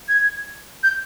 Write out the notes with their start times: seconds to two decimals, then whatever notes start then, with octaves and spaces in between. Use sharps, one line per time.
0.09 G#6
0.83 G6